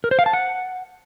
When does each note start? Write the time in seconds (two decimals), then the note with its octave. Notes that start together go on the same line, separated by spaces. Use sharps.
0.04 A#4
0.11 C5
0.19 F5
0.26 A5
0.33 F#5